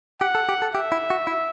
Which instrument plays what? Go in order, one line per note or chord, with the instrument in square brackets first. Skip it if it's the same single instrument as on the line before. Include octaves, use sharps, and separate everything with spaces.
[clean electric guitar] G4 [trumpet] F#5
[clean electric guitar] A4
G4
A4
[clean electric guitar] G4 [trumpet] E5
[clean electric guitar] E4
F#4
E4